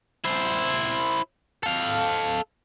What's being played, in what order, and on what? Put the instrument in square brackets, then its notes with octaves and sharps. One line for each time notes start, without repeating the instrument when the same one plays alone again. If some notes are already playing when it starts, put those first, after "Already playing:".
[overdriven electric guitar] E4 C5
A4 F5